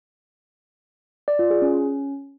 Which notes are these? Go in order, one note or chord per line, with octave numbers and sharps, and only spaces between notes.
D5
F4
G#4
C#4